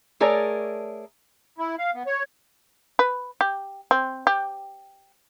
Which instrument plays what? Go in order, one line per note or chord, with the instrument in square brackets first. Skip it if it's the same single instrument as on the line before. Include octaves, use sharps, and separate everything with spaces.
[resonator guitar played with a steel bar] A3 G#4 A#4 C#5 D5
[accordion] E4
F5
B3
C#5
[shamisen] B4
G4
C4
G4